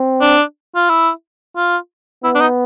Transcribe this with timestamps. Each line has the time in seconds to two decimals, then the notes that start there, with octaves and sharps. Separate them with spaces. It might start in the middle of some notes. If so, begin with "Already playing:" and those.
Already playing: C4
0.21 D4
0.75 F4
0.89 E4
1.57 F4
2.24 B3 E4
2.35 D4
2.41 D#4